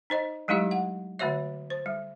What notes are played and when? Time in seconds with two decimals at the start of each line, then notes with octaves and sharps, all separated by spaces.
0.10 D#4 C5 D#5
0.48 F#3 G#3 A3 D#4 E4 G4
0.71 F#5
1.19 D3 A3 F#4 C#5 E5
1.70 C5
1.86 G3